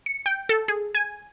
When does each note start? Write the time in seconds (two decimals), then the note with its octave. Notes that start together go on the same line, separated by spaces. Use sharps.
0.06 C#7
0.26 G5
0.49 A4
0.68 G#4
0.95 G#5